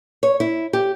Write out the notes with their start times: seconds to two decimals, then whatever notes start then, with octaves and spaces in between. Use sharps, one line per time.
0.23 C#5
0.40 E4
0.73 G4